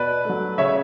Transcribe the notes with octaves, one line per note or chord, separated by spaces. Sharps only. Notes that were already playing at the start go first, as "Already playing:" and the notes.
Already playing: B2 B4 D5
F#3 A3
C#3 C#5 E5